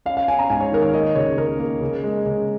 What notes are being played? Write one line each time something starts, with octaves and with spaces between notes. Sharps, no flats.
C#4 F5
F5
C#4 G#5
A#5
G#2 G#5
C#5
D#3 A#4
C#5
A#3 D#5
C#3 C#5
C#3 A#4
A#3
C#3
G#3
C#3